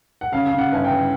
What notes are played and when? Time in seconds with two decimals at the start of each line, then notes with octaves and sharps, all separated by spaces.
0.21 F#5
0.32 C#3 F5
0.47 F5
0.52 C#3
0.58 F#5
0.72 G1 G#5
0.85 G5
0.91 E3